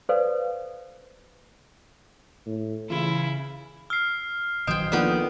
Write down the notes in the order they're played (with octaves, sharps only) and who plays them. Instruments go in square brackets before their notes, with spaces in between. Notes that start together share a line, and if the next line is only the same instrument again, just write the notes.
[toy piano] A4 B4 C5 D5 F5
[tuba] A2
[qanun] C#3 F4 [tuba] E3 [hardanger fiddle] E4
[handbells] E6 [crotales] F6 C7
[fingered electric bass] A#1 D#3 F#3 [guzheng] C5 G5 [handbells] D#5 D#6 [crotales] D7
[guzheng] D#3 B3 [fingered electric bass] F3 A#3 D4 [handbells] F4 A4 D5